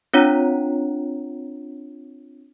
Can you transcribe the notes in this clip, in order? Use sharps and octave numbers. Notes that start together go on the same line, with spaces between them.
C4 D4 F4 C#5 F#5 A#5